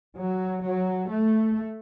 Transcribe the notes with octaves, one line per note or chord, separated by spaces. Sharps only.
F#3
F#3
A3